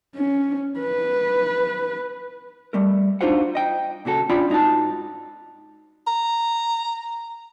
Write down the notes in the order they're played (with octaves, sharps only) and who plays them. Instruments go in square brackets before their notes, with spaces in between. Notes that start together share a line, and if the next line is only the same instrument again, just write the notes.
[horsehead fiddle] C#4
B4
[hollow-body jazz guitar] G3 A3 A#4
D4 D#4 F4 F#4 C5 F#5
D#5 G5
A#2 C#3 F#4 A4
C#4 D4 F4 D5 G5 B5
G#2 D#4 F#4 A5
[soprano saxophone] A#5